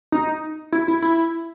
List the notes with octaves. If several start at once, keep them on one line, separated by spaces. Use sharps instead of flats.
D#4
E4
E4
E4